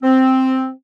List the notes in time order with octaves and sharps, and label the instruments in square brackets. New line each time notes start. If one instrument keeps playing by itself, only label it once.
[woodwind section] C4